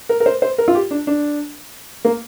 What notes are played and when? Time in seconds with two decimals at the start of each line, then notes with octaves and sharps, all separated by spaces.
0.09 A#4
0.20 A#4
0.26 C5
0.42 C5
0.58 A#4
0.68 F4
0.75 G4
0.91 D4
1.07 D4
2.05 A#3